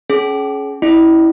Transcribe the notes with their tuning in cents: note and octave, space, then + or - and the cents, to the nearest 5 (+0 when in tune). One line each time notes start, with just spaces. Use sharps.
C#4 +0 G#4 +35
C#4 +0 E4 -15 D5 +45